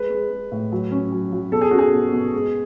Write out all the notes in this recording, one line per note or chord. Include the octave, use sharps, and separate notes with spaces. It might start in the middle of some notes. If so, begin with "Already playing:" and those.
Already playing: G#3 B4
G#3
G#3
A2
F#3
C#4
F#3
F#3
B2 A4
G#4
C#4 F#4
G#4
B2
B2
G#3